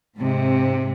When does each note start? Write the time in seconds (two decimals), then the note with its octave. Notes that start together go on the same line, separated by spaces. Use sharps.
0.16 G#2 C3